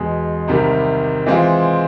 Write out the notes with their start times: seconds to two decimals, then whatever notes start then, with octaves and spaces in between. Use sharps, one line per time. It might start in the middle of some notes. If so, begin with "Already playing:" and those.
Already playing: E2 B2 G#3
0.48 C2 C3 D#3 G3
1.26 E3 G#3 C4 F4